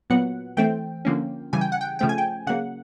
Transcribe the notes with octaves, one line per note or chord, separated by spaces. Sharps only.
A#2 F#3 B3 F#5
E3 A3 C4 G5
D3 F3 A#3 C#4
C#3 E3 G3 G#5
G5
F#5
G5
C#3 F3 A3 C4 G5
G#5
G5
C#3 F#3 A#3 F#5